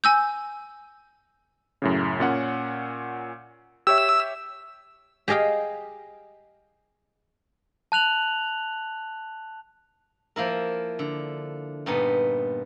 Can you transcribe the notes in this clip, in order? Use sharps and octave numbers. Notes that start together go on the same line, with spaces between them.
G#5 E6 G6
F#2 A2 C#3
A#2 C#4 F#5
G4 C#5 E5 E6
G4 G#4 D#5 F5 G5
A5 F#6 F7 F#7
F3 A#3 E4 A#4
D3
G2 A#2 B3 D#4